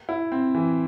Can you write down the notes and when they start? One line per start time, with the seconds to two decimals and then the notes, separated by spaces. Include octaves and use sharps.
0.09 E4
0.32 C4
0.55 E3